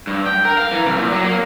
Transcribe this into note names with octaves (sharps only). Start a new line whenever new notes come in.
G2
G5
A#4
F5
E3
C2
A#2
F#3
A#3